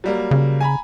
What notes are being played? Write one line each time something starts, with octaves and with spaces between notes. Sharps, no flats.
F#3 G3 A#3
C#3
G#5 A#5 B5